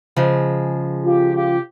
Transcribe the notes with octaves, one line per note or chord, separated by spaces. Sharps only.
C#3 F3 G#3
F4 G4
F4 G4